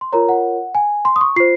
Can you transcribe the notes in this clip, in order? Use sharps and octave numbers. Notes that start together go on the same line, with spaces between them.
C6
F4 A#4 C#5 A#5
F#5
G#5
C6
D#6
C#6
F4 C5 C7